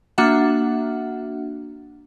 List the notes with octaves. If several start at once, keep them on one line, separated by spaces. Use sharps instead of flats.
A#3 D4 F#4 E5 F#5